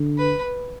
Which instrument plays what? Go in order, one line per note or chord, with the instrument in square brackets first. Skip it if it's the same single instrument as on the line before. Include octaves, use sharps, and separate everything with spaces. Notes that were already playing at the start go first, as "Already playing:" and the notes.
Already playing: [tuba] D3
[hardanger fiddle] B4